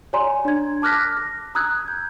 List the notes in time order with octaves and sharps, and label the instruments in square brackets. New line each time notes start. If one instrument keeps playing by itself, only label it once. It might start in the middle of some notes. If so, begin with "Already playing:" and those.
[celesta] C#5 D5 G#5 A#5 C6
D4 G#6
A5 D6 F6 F#6 A#6 B6
A#6
A#5 D#6 E6 F#6 G#6
G6